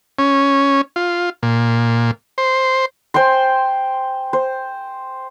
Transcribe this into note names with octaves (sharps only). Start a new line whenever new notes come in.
C#4
F4
A#2
C5
C5 G5 G#5 C6
C5